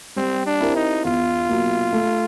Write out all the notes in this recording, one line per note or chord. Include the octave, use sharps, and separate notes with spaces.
G3 C4
D4
C4 E4 G4 A#4
D#4
E2 F4
B2 F#3 A#3
A3